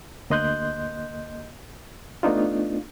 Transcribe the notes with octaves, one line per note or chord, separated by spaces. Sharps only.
D2 A#3 D#5 C6 F#6 G6
A3 B3 D4 D#4 F4